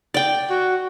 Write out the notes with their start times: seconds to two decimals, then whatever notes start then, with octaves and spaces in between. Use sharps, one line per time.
0.14 D5 G5
0.50 F#4